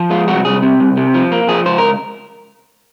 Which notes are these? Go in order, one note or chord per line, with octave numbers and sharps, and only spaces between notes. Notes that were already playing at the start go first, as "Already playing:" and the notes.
Already playing: F3
G#3 F4
C2 F#4
C2 G#4
C3
C2
C3
F3
A#3
F3 G#4
C#2 C5
A#4